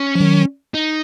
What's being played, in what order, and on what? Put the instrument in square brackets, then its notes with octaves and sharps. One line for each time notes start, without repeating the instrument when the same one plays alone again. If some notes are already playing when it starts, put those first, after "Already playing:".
Already playing: [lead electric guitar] C#4
[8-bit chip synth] F3
D#3 F#3
[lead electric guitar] D#4